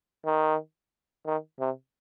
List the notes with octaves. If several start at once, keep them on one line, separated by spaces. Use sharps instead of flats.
D#3
D#3
C3